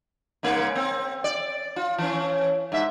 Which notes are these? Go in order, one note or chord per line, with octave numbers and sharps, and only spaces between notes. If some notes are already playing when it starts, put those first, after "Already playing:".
G#2 C#3 A#3
C4
D5
F4
E3 C#4
G#2 E5